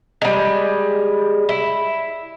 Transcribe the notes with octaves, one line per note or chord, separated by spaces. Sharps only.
G3 G#3
E4